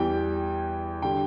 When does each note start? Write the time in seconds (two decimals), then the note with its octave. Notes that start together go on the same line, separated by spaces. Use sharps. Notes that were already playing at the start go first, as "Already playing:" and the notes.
Already playing: E2 E3 G3 G5
1.02 D3 G3 G5